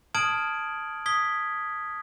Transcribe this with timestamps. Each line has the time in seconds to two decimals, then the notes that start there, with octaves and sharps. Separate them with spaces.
0.15 A5 D#6 F6 G#6 D7 F#7
1.06 D#6 G#6 B6 G7